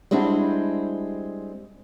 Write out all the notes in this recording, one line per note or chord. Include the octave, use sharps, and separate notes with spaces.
G3 G#3 C4 D4 E4 F#4